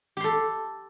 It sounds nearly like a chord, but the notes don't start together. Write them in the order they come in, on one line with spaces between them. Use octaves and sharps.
G4 C6 A4